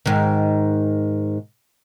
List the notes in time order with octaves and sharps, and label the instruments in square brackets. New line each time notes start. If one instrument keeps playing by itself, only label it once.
[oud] G#2 D#3